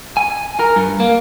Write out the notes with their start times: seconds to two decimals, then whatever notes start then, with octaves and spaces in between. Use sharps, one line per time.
0.17 G#5
0.59 A#4
0.76 G2
1.00 A#3